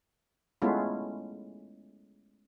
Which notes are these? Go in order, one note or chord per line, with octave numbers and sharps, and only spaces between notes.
G#3 A3 B3 C#4 E4 F4